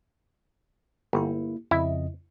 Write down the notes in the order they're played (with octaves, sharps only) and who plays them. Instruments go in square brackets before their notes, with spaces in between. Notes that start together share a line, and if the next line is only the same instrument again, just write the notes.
[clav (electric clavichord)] G1 [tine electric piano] A#3 E4
[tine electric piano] F2 C#3 D#5 [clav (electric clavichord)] E4